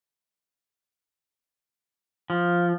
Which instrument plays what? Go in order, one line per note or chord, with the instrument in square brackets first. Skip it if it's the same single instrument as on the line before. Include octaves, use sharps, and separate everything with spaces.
[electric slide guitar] F3